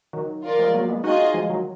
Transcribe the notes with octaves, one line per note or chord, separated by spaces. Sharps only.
D#3 F#3
F4 A#4 D5
F3 G#3
F#3 A#3
G#3 B3
D#4 F4 F#4 G#4 D#5
F3 G#3
D#3 F#3